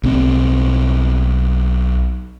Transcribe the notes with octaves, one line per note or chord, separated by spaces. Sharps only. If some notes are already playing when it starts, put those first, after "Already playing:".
B1 C4